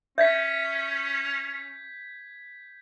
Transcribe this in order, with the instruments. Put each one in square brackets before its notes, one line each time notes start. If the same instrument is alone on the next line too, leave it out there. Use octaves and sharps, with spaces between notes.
[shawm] C#4 [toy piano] E5 [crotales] G6 G#6 B6